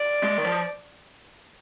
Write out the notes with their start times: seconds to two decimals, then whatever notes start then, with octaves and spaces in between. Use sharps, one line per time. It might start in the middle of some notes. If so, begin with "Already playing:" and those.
Already playing: D5
0.23 G#3
0.38 D#3
0.45 F3